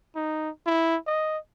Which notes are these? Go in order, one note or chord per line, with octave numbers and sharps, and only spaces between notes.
D#4
E4
D#5